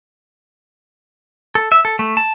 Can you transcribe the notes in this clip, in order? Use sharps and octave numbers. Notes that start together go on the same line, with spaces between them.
A4
E5
A4
A3
A5